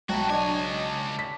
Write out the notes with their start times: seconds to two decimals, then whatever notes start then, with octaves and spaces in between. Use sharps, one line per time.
0.09 B1 E4 F#4 G5 A5 A#5
0.30 C#2 D4 C#5 D#5 G#5
1.19 B6